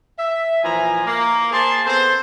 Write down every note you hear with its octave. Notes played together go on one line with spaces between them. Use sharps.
E5
A#2 E3 F3 G#5 A#5
A#3
A#3 G#4 C5 A5 C6
B3 C4 A4 C5